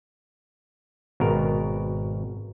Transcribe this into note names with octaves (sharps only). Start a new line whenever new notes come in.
G#1 B2 A#4